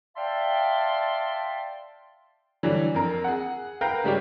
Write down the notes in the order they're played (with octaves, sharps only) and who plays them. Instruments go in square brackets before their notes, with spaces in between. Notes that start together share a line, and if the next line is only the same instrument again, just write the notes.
[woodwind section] D5 E5 F5 G5 A5 C6
[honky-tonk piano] D3 E3 F#3 G3 D4
F2 A#4
G#4 F#5
A#4 B4 F5 G5 A#5
C#3 G3 G#3 C#4 G4